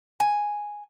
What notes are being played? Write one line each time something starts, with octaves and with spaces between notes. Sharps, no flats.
G#5